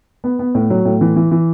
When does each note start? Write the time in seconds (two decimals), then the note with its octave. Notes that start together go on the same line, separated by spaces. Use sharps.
0.24 B3
0.39 B3
0.55 A2
0.70 F#3
0.85 A2
1.01 E3
1.16 E3
1.31 E3